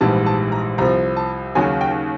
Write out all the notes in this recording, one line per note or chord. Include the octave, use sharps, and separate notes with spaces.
A#1 G#2 E3 G3 A5
A5
A#5
C2 C3 F3 A#5
A5
D#2 C#3 F#3 G#5
G5